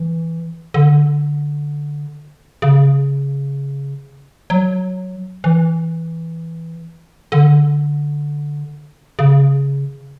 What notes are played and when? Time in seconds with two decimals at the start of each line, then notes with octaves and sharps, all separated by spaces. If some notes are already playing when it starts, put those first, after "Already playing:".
Already playing: E3
0.74 D3
2.62 C#3
4.50 F#3
5.44 E3
7.32 D3
9.19 C#3